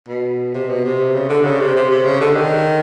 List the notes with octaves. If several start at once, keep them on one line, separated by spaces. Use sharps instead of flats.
B2
C3
B2
C3
C#3
D3
C#3
C3
C3
C3
C#3
D3
D#3